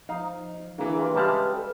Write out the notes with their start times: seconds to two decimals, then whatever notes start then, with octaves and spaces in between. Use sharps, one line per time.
0.09 F3 D#4 F5
0.78 D3 E3 A#3 G#4
0.99 A#3 F4 G4 B4
1.15 C#3 G3 G#3 E5 A5 F6
1.55 A4 B4